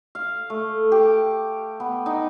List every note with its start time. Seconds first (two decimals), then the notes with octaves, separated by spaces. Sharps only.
0.15 F5
0.50 A3
0.92 G4
1.80 B3
2.06 D#4